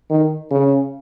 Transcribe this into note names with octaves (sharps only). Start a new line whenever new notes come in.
D#3
C#3